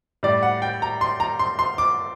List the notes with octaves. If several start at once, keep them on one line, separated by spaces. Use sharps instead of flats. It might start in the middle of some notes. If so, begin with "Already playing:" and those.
A2 G3 D5
F#5
G5
A#5
C6
A#5
C6
C6
D6